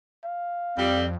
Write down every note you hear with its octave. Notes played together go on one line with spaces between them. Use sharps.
F5
F2 G3 C4